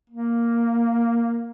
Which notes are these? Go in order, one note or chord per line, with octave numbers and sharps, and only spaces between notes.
A#3